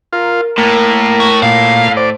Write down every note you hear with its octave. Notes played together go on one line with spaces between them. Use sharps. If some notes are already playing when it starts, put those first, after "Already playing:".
F4 A#4
A2 A#3
F#4
A#2 F5
C5 D5